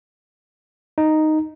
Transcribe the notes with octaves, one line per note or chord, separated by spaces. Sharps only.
D#4